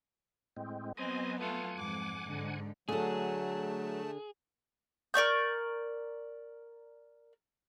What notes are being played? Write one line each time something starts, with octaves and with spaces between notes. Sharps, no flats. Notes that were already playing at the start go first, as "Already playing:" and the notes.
A2 G#3 C4
F#3 B3 C4 D#5 G#5
A3 F4 F#5 G#5
F2 G#2 D6
G#2 D3
D3 F#3 A3 G#4 A4 A5
A#4 D5 C#6 G6